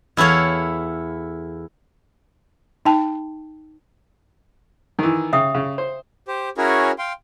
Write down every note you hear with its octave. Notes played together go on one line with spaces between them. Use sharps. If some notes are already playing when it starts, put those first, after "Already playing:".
E2 E4 A4 C#5 F5
D#4 G5 A5
D#3 E3
C#3 E5 G5 D#6
C#3
C5
G4 C5
C#4 E4 F#4 G#4 A#4 C#5
F5 G5 C6